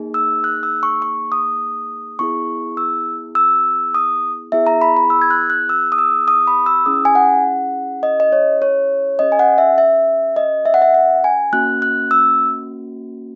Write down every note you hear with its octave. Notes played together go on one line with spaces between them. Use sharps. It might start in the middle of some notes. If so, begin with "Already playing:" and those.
Already playing: A#3 D#4 G#4
E6
F#6
E6
C#6
C#6
D#6
B3 E4 G#4 C#6
E6
E6
D#6
B3 E4 G#4 E5
A#5
B5
B5
E6
G#6
F#6
F#6
E6
D#6
E6
D#6
B5
E6
C#4 E4 G#4 D#6
G#5
F#5
D#5
D#5
C#5
C#5
C#4 G#4 D#5
G#5
F#5
E5
E5
D#5
E5
F#5
E5
F#5
G#5
A#3 C#4 F#4 F#6
F#6
E6